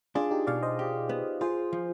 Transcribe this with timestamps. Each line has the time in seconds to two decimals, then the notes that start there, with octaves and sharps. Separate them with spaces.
0.15 D4 F4 G#4
0.31 D#4 G4
0.47 B2 D5 F5
0.63 C5 D#5
0.79 G4
1.09 B3
1.41 F4 G#4 C5
1.73 F3